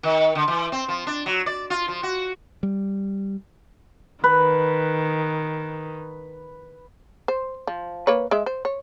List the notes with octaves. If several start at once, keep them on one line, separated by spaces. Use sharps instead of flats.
D#3
D3
E3
C4
F3
D4
F#3
D5
F4
F3
F#4
G3
D#3 B4
C5
F3
A#3 B4 C#5
G#3 E5
C5
C#5